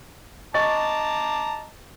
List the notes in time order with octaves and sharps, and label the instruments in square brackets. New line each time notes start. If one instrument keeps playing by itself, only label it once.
[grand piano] D#5 C#6 A6 [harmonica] A5 A#5 D6